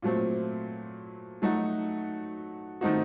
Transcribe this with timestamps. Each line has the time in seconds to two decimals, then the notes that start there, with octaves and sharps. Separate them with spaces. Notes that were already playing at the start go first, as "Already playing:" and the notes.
0.02 A#2 F#3 A3 C4
1.42 F#3 A3 D#4 F#4
2.81 D#3 A3 C4 D#4 F#4